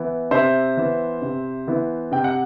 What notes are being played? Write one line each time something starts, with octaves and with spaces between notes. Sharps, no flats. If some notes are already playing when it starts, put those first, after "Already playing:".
Already playing: E3 B3 E4
C3 C5 E5
E3 B3 E4
C3
E3 B3 E4
C3 G5
F#5